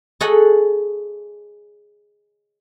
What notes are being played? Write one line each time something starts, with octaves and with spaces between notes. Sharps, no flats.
G#4 A4 C#5 D#5 F#5